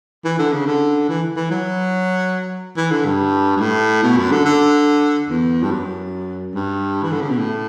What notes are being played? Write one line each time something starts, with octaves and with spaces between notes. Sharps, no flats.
E3
D3
C#3
D3
E3
E3
F#3
E3
D3
G2
G2
A2
B2
F#2
D3
D3
E2
G2
F#2
G2
E3
D3
C#3
B2
A2